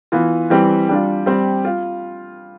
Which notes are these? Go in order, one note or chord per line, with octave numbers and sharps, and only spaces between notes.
E3 B3 F4
E3 G3 C4 G4
G3 D4 F4
G3 C4 G4
F4